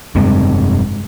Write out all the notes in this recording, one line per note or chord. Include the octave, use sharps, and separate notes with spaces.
F1 G2 G#3 C4